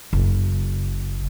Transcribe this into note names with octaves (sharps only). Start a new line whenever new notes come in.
F#1